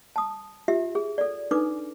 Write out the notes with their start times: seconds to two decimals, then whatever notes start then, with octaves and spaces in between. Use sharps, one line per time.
0.16 A5 D#6
0.68 F4 G4 E5
0.95 G#4
1.18 A4 D5
1.51 D4 D#4 A4 B4 D6